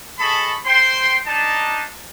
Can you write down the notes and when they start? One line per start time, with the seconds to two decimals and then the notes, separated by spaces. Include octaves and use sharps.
0.19 G#4 A4 D#5 A5 B5 C#6
0.65 C5 G5 C6
1.27 D4 D#4 A5